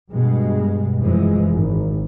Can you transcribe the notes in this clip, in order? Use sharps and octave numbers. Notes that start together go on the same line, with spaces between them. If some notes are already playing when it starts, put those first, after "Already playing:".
G2 B2 G#3
F1 F#2 E3 F3 G#3
G#1